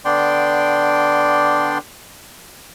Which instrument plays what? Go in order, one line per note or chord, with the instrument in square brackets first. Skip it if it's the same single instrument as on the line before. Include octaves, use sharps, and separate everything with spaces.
[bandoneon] D3 B3 D4 D5 G5 C6